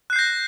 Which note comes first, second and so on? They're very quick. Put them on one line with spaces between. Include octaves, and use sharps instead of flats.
F#6 C7 G6 A#6